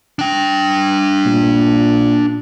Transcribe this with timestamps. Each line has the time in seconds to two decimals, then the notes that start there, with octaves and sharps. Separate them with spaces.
0.19 D4 G5
1.26 A#2